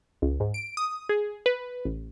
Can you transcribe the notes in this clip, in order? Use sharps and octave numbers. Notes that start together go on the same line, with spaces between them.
C#2
G#2
D7
D#6
G#4
B4
A1